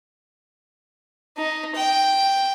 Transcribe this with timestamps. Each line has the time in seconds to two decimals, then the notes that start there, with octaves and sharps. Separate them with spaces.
1.37 D#4
1.75 G5